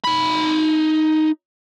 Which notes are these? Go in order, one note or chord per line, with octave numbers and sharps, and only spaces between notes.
D#4 B5